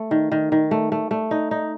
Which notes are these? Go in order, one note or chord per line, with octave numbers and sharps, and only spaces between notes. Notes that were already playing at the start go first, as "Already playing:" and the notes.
Already playing: A3
D#3
D#3
D#3
A3
A3
A3
D#4
D#4